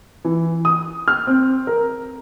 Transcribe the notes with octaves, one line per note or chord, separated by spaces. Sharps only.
E3
D#6
F6
C4
A#4